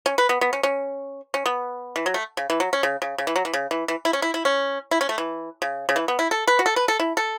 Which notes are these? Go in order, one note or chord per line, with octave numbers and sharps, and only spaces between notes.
C#4
B4
B3
B3
C#4
C#4
C#4
B3
E3
F#3
A3
C#3
E3
F#3
C#4
C#3
C#3
C#3
E3
F#3
E3
C#3
E3
E3
E4
C#4
E4
E4
C#4
E4
C#4
A3
E3
C#3
C#3
E3
B3
E4
A4
B4
F#4
A4
B4
A4
E4
A4